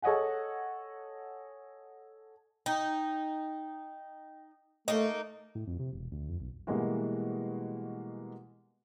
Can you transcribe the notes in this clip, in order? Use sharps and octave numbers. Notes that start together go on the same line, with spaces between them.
A4 C#5 D#5 F#5 G#5
D#4 G5
A3 A#3 D#4 D#5
A2
F2
C3
E1
D2
F2
B1
B2 E3 G3 G#3 A#3 F#4